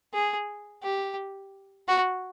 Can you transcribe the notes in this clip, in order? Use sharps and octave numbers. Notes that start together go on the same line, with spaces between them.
G#4
G4
F#4